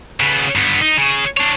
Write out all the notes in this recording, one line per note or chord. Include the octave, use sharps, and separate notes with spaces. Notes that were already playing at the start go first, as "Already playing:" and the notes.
C#3 B3
G2 B3
D#4
C#3
D4 C#5